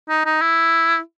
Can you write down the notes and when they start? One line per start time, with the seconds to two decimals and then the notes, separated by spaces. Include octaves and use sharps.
0.09 D#4
0.25 D#4
0.41 E4